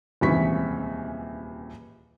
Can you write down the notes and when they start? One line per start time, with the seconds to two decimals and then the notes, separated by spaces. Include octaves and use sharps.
0.21 D#1 C#2 C3 E3 C#6 B6